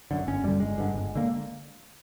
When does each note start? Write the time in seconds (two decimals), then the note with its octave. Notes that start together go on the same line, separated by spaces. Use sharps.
0.11 F#2 D3
0.27 G1 C#4
0.43 F#2 D3 G3
0.60 G1 G#3
0.78 G2 D3
0.94 G1
1.15 D3 A#3